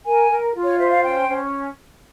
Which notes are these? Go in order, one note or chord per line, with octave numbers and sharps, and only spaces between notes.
A#4 G#5
A#4
F4
C#5
C5 E5
F5
C#4 G5
C#4